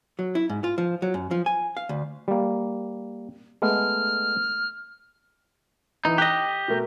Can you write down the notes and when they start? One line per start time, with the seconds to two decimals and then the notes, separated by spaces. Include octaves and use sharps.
0.19 F#3
0.35 E4
0.49 G#2
0.64 F4
0.78 F3
1.02 F#3
1.14 F#2
1.31 F3
1.46 G#5
1.77 F5
1.89 D2
2.28 G3 A#3
3.62 G#3 A3 B3 F6
6.05 E3 D#4
6.18 G4 D#5 F#6
6.68 B2 A3 A#4